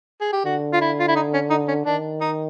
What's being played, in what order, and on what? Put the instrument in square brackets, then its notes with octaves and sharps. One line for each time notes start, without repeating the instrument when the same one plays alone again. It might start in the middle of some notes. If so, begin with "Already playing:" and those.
[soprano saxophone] G#4
G4
[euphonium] D3 [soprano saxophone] F#4
[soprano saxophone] F4
E4
F4
E4
D#4
C#4
D#4
C#4
[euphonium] D#3 [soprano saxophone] D4
[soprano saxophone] D#4